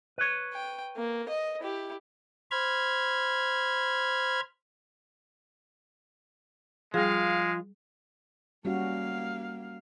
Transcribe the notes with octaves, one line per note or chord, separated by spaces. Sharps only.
B4 C#5
G5
A#3
D#5
E4 G4
C5 B5 F6 G#6
F3 G3 G#3 F4 G#4 F5
G3 A#3 C#4 F#4 F5